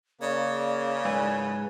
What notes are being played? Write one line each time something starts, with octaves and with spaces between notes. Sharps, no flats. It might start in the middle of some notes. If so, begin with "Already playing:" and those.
C#3 A#3 D5
G#2 B4 G#5